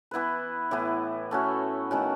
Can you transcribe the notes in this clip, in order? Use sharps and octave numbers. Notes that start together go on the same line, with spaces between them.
E3 B3 E4 B4
A2 E3 B3 E4
A3 C#4 F#4
D#3 A3 C#4 F#4